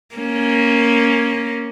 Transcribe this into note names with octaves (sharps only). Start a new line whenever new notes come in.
A#3 C#4